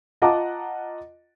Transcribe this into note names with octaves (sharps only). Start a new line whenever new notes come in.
F4 D#5 F#5 A5 A#5 D6